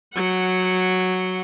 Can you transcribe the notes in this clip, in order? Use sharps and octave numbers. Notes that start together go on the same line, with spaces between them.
F#3 F#5